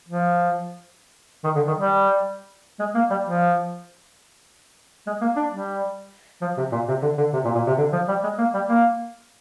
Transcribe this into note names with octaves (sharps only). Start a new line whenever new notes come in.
F3
D#3
D3
D#3
G3
G#3
A#3
G3
F3
G#3
A#3
D4
G3
F3
C3
A#2
C3
D3
D3
C3
A#2
A#2
C3
D3
F3
G3
G#3
A#3
G3
A#3